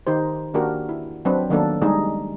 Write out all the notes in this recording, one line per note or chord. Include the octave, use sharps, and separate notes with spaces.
D#3 D#4 G4 C5
D#3 A#3 D4 F#4 G4 A#4
E4
F#3 C4 D4 B4
D#3 F#3 A#3 B3 D4 A4
G3 G#3 D4 D#4 G4 G#4